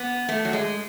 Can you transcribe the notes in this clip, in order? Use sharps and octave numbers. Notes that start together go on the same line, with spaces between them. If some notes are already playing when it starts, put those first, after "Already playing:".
Already playing: B3
A3
F#3
G#3